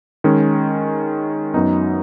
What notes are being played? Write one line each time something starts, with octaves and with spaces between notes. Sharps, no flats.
D#3 G#3 C#4
F#2 F#3 B3 D#4